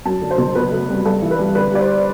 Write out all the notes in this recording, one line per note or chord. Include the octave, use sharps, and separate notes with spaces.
F#2 A5
D3
C5
F#1
B2 B4
A3
C2
G2 A4
E3
B4
G3
D3 B4
G3 D5
C5